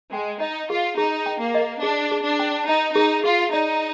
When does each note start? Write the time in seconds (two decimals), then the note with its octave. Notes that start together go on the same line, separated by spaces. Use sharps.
0.12 G#3 G5
0.40 D#4 D#5
0.70 F4 G#4
0.97 D#4 G#4
1.26 G5
1.39 A#3
1.54 D#5
1.82 D4 G#4
2.12 G#4
2.25 D4
2.39 G5
2.68 D#4 D#5
2.95 D#4 G#4
3.24 F4 G#4
3.53 D#4 D5